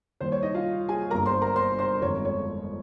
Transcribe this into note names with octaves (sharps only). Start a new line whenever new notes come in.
D#2 D#3 G3 C5
C#5
D#4 D#5
F4 F5
G#4 G#5
G1 G2 G3 A#3 A#4 A#5
C5 C6
A#4 A#5
C5 C6
C5 C6
G1 F2 D#3 G#3 C#5
C#5